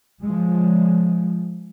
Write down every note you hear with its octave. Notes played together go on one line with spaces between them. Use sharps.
F3 G#3